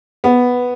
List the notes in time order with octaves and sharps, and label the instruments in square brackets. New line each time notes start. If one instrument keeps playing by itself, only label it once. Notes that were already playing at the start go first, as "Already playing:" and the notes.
[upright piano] B3